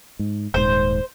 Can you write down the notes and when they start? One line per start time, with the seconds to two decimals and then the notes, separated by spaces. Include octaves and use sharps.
0.19 G#2
0.54 D#1 G#2 C5